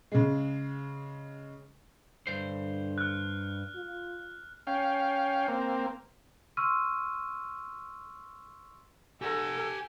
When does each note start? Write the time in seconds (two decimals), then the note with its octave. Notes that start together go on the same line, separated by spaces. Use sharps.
0.12 C#3 G#3
2.27 G2 D3 C5
2.98 F6 F#6
3.76 F4
4.67 C#4 F5 G5
5.48 A#3 C4
6.57 C6 C#6 E6 F6 D#7
9.22 G4 A4 F#5 G#5